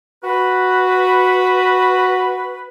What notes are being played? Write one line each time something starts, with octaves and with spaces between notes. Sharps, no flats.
F#4 B4